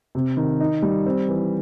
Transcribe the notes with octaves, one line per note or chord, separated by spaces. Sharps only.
C3
D#3
D#4
G3
C4
E3